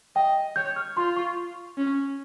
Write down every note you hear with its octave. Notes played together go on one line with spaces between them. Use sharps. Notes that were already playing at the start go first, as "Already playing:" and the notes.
D#5 G5
C#5 G6
F6
F4 C6
C#6
C#4